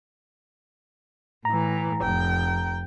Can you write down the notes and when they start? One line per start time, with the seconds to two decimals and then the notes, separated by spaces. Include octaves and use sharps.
1.45 A2 E3 A#5
2.01 F1 G5